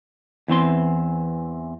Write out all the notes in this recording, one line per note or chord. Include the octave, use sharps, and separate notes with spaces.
E2 E3 C4 C6